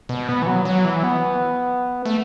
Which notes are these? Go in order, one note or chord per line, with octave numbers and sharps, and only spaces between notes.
B2
B3
E3
F#3
F#3
E3
B3
A3